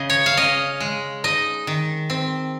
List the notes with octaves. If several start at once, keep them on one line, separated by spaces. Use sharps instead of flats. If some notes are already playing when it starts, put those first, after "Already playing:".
Already playing: C#3 D#5
C#5
F5
C#4 D#5
G#3
D#4 D#5
D#3
C4